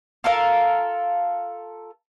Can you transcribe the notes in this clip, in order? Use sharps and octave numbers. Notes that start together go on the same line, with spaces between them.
F4 A4 A#4 F5